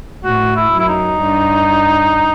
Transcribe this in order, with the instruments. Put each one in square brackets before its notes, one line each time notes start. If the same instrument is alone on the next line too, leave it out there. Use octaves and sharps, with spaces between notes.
[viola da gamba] A2 [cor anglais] F#4
[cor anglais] E4
[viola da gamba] F#2
[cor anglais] E4
D#4
[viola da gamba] G2